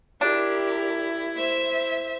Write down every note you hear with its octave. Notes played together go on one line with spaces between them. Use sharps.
D4 E4 G4 A#4
C5 E5